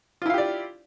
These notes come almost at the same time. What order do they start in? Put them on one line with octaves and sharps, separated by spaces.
F4 E4 F5 G4 D5